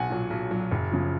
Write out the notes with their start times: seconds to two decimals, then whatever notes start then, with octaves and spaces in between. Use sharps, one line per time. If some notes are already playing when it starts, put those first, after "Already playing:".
Already playing: B1 F#5 G#5
0.10 A#2 F#3
0.30 B1
0.51 A#2 F#3
0.71 F#1
0.91 C#3 F3